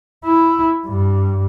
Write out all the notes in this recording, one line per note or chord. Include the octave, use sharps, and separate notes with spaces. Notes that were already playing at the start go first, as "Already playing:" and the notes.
E4
G2